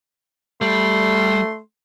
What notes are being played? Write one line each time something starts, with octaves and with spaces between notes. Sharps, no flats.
G3 A3 C6